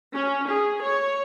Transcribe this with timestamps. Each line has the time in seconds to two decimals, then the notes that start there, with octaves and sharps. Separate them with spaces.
0.13 C#4
0.49 G#4
0.80 C#5